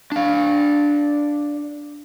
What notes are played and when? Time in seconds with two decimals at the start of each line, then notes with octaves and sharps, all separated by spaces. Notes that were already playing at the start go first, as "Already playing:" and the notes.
0.12 D4 F5